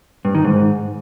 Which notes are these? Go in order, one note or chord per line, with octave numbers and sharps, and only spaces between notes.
G2
D#3
G#2